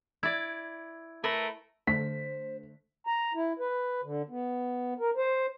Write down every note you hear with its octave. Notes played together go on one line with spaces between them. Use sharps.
E4 D5 G#6
A3 A#4 B4
D3 A3 C5 B6
A#5
E4
B4
D3
B3
A#4
C5